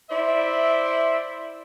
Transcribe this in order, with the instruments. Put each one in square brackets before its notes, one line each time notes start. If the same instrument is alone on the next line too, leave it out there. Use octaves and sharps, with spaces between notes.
[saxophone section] E4 C5 D5 E5